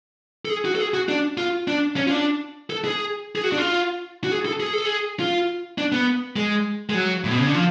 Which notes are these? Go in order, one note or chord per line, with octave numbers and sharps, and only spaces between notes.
A4
G#4
F#4
A4
G#4
F#4
D4
F4
D4
C#4
F4
D4
A4
G#4
G#4
F#4
D4
F4
F#4
G#4
A4
G#4
A4
G#4
F4
D4
B3
G#3
G#3
F#3
A2
B2
C#3
D3
F3